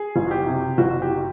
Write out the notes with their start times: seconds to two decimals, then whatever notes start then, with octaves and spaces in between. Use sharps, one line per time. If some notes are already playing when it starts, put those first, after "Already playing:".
Already playing: G#4
0.16 F#1
0.27 F#4
0.31 G4
0.46 C3
0.78 F#1 F#4
1.02 G4